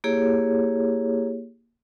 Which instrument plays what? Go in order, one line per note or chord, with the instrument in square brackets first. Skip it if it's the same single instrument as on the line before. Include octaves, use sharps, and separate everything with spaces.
[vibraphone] A#3 E4 G4 G#4 C#5